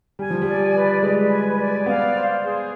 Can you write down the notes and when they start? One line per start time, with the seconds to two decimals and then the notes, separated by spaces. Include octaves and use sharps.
0.19 G3 G#5
0.30 F3
0.42 G3 D5
0.74 B4
1.02 G#3 B4
1.30 G#5
1.58 D5
1.86 B3 F5
2.14 C5
2.42 G#4